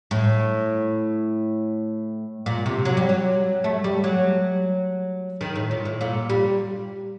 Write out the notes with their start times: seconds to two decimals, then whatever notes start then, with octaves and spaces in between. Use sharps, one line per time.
0.11 A2
2.46 A#2
2.66 C3
2.85 F#3
2.97 G3
3.09 F#3
3.64 A3
3.84 G3
4.04 F#3
5.41 D#3
5.56 A2
5.71 A#2
5.85 A2
6.01 A#2
6.29 G3